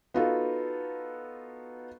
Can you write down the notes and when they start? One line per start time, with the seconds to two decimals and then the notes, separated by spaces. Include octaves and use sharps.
0.14 B3 D#4 F4 F#4 A4